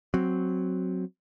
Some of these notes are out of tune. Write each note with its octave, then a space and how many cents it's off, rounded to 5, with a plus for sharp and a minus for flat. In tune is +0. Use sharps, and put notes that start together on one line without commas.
F#3 +0 C4 +0